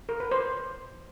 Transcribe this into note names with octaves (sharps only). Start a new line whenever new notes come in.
A#4
B4
C5